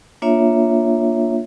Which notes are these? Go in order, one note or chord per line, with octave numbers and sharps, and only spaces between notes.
A#3 D4 F4 C#5 E5